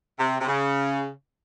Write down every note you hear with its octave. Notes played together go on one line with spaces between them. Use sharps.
C3
C3
C#3